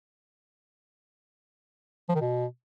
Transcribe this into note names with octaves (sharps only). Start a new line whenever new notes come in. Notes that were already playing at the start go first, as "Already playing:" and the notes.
F3
D#3
B2